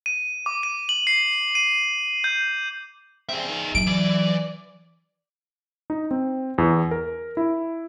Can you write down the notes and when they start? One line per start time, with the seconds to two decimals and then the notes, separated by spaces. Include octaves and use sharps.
0.06 D#7
0.46 D6
0.63 D#7
0.89 F#7
1.07 C7
1.55 D#7
2.24 G6
3.29 C4 G#4 E5
3.49 D#3
3.75 F#3 D7
3.87 E3 D5
5.90 D#4
6.11 C4
6.58 E2
6.91 A#4
7.37 E4